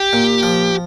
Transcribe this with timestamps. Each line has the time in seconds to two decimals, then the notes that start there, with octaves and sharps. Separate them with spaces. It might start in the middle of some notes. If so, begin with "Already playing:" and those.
Already playing: G4
0.13 A#2
0.43 F3